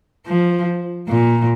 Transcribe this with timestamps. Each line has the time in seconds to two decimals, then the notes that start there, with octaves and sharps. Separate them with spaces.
0.27 F3
1.08 A#2